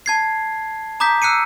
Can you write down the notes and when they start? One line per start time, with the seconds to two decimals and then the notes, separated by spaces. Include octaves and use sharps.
0.06 A5 G#6 C7
1.00 A#5 D6 D#6 G6 B6
1.22 E6 F#6 C7 C#7 D#7